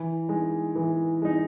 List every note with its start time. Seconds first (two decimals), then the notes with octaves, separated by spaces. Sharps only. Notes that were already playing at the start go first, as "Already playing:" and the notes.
Already playing: E3
0.29 G#3 D#4
0.75 E3
1.22 G#3 D#4